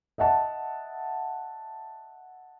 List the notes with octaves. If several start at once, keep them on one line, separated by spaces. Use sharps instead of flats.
D#5 E5 F#5 A5